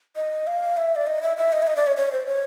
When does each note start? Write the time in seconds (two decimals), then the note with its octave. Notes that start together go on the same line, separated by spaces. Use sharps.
0.16 D#5
0.47 F5
0.77 E5
0.96 D5
1.07 D#5
1.22 E5
1.37 E5
1.53 D#5
1.62 E5
1.67 D#5
1.76 D5
1.87 C#5
1.97 C#5
2.12 C5
2.27 C#5